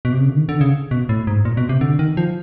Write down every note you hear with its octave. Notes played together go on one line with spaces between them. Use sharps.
B2
C3
C#3
D3
D#3
D3
C#3
B2
A2
G#2
A#2
B2
C3
D3
D#3
F3